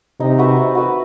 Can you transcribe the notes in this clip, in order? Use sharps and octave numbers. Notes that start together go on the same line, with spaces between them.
C3 D#4
F#4 B4 E5
D#4
F#4 B4 E5